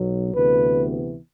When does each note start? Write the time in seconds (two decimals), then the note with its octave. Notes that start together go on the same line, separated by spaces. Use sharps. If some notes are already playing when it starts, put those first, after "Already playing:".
Already playing: B1 B2 F#3
0.34 D2 C3 E3 B3 B4